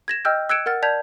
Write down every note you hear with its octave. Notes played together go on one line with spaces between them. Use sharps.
G#6 A#6 E7
D#5 G5 E6 F6 G6
E6 F#6 G#6 C#7 D7 E7
A#4 F#5 F6 A6
D5 A5 G6 G#6 B6 F7